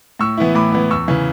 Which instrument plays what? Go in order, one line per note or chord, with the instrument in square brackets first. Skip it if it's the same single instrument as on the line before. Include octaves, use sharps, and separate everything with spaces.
[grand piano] A2 C#6 E6
E3 B3 E4
A2 B5 D6
E3 B3 E4
E2 C#6 E6
C#3 E3